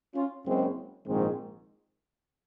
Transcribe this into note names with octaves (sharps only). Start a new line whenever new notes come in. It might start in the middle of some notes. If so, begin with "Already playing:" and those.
C#4 F4
F#1 F#2 C#3 G#3 C4
A#1 G#2 D#3 G#3 C4